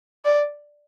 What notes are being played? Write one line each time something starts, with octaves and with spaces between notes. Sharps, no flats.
D5